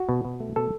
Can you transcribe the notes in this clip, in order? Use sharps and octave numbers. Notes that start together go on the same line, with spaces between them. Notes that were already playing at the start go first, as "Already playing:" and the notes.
Already playing: F#4
B2
B2
A3
B2 A4